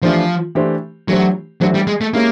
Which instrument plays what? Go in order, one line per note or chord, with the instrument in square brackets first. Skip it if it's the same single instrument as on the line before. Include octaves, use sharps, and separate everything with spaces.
[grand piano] E3 A3 D4 G4 C5 [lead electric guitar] F3
[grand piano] E3 A3 D4 G4 C5
[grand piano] E3 A3 D4 G4 C5 [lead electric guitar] F#3
[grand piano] E3 A3 D4 G4 C5 [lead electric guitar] F#3
[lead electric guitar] G3
G#3
A3
[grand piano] G#3 C#4 E4 G4 [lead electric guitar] A#3